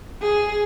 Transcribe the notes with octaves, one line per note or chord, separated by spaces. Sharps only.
G#4